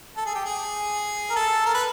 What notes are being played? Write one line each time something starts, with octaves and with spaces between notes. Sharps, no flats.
A4
G#4
G4
G#4
A#4
A4
A#4
B4